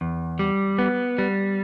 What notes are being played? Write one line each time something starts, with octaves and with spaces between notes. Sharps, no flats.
E2
G3
B3
G3